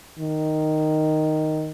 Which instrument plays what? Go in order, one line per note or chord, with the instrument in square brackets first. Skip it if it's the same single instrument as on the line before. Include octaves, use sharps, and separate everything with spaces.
[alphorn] D#3